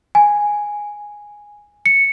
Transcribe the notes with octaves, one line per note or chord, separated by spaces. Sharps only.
G#5
C#7